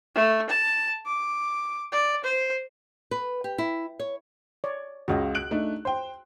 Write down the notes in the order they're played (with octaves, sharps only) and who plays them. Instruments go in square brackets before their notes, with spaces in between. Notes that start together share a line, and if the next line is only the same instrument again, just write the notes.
[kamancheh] A3
A5
D6
D5
C5
[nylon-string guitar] B4
G4
E4
C#5
[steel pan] C#5 D5
[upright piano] C#2 C#3 [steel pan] F#4 G#4 D#5
[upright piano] F#6 D7 F#7
A3 D4 D#4
[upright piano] C5 G5 [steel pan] C6